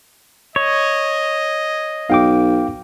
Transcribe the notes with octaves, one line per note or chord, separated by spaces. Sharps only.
C#5 D#5
B1 F5 G5 D6